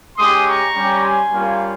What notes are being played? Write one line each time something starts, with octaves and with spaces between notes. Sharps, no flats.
G#3 C#4 G4 C6 D#6
A#5 C#6
G3 C#4 G4
G#5 C6
G3 A#3 C#4 F4